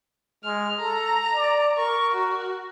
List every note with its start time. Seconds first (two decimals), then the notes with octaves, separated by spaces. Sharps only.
0.44 G#3 F6
0.80 A4 A#5
1.34 D5
1.78 A#4 C#6
2.12 F#4